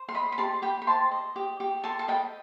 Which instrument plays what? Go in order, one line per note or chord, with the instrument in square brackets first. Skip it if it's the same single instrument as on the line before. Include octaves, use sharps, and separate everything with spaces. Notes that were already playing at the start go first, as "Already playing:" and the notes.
Already playing: [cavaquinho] C5
C6
D#5 B5 D#6
B5
G4 A5 C6
G4 G5 B5
B5
C5 A5 C6
D#5
G4
G4
A4 A5 C6
A5
D#5 G5 B5